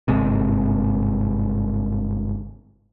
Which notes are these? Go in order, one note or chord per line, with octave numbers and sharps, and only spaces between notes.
G1 G#2 C3